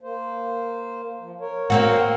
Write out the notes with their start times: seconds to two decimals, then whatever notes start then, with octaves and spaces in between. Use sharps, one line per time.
0.01 A#3 C5
1.19 F3
1.40 A#4 C#5
1.70 A#3 C4 F#4